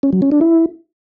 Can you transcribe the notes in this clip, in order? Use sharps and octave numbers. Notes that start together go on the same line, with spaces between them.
C#4
F#3
C#4
D4
E4